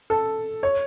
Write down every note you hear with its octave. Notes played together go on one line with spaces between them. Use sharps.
A4
C#5